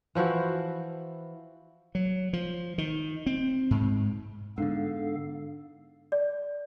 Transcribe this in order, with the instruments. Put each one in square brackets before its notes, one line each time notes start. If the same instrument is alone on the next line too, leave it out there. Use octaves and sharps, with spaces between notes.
[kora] E3 F3 E4 F#4
[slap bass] F#3
F3
D#3
C4
G#2
[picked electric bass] G#2 D3 [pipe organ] B3 A4 F5 [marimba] D4
[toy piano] D5